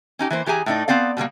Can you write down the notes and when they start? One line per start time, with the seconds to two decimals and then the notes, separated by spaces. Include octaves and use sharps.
0.19 C#4 D#4 G4
0.30 E3 A#3 C5
0.46 E3 G4 G#4 G#5 A#5
0.66 A2 A3 D#4 D5
0.88 B3 C4 D5 F5
1.17 B2 G3 G#3 A#3